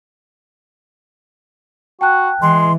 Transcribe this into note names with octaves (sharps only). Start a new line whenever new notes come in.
F#4 G5 A5 F#6
E3 G#3 C6